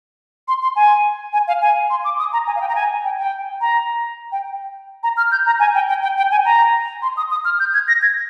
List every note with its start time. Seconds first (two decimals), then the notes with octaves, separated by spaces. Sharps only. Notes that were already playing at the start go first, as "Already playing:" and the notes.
0.48 C6
0.62 C6
0.76 G#5
1.33 G#5
1.48 F5
1.62 G#5
1.90 C6
2.04 D6
2.19 D#6
2.33 A#5
2.47 G#5
2.56 F5
2.61 G5
2.68 A#5
2.75 G#5
3.04 G5
3.19 G5
3.61 A#5
4.32 G5
5.03 A#5
5.17 F6
5.32 G6
5.46 A#5
5.60 G#5
5.75 G5
5.89 G5
6.03 G5
6.17 G5
6.31 G#5
6.45 A#5
7.02 C6
7.17 D#6
7.31 D#6
7.45 F6
7.60 G6
7.74 G#6
7.88 A#6
8.02 G#6